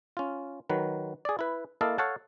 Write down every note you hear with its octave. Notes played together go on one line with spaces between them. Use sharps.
C#4 F4
D#3 F#3 B4
G#4 D5
E4 B4
A#3 E4 A4 D#5 F5 A5
A4 C#5 F5 F#5 A5